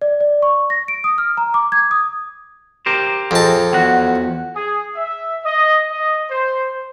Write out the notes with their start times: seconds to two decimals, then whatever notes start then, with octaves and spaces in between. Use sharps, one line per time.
0.02 D5
0.21 D5
0.42 C#6
0.70 A#6
0.88 D7
1.04 D#6
1.18 F6
1.37 A#5
1.54 D6
1.72 G#6
1.91 D#6
2.86 G4 A#4 C5
3.31 F2 G#4 A5
3.73 E2 F#4 F#5
4.55 G#4
4.96 E5
5.45 D#5
5.91 D#5
6.30 C5